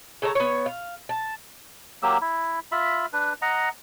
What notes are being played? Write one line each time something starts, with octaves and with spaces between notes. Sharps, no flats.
C#3 A4 C#5 A#5
B3 C#5
F5
A5
F#3 A#3 G4 E6
E4
F4 E5 B5
D4 B4
D#5 F#5 A#5